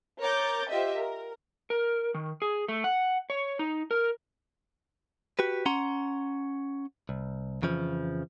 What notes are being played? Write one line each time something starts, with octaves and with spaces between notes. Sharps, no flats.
A#4 C#5 A#5 D6 G6 A6
F4 G4 C5 D#5 E5
A#4
A#4
D#3
G#4
A3
F#5
C#5
D#4
A#4
F#4 G4 B4
C#4 F#5 A#5 C6
C2
F2 C#3 E3 F3